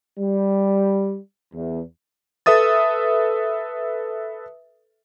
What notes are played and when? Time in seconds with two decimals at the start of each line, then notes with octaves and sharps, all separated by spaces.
0.18 G3
1.54 E2
2.46 A4 B4 E5 D#6 A6